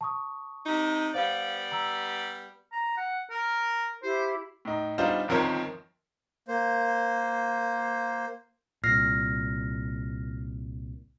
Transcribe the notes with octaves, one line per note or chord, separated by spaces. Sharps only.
A5 C#6 D#6
C3 D#4
G3 B3 C5 D5 F5
A#5 E6
A#5
F#5
A#4
E4 G4 C5
A2 D#4
G3 B3 D4 D#4 F4 C5
G1 D#3 F3 C4 A#4 C#5
A#3 C5
C2 A#2 F6 A#6 C7